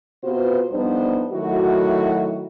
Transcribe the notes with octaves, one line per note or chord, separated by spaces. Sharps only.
C3 B3 F4 F#4 B4 C5
F2 G3 B3 D4 D#4 C5
D#3 F#3 A3 E4 F#4